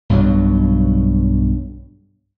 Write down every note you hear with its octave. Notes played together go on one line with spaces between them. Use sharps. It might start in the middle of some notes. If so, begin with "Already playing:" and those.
B1 G2 B2 F#3